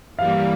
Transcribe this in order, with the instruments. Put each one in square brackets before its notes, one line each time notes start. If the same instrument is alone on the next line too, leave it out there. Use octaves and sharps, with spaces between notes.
[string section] G2 E3 G3 A#3 [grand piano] F5